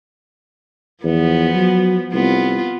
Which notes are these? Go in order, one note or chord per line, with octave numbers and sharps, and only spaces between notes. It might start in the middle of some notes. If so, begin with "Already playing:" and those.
E2 F3 B3
F#3
C2 B3 F4